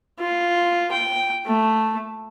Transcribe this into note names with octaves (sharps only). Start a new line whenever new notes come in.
F4
G5
A3